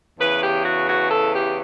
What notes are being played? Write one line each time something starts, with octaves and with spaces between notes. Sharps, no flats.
E2 C#3 E3 B4
G4
F#4
F#4
A4
G4